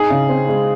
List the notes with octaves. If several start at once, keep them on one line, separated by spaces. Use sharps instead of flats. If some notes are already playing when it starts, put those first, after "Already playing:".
Already playing: D#4 G#4
C#3
C4
G#3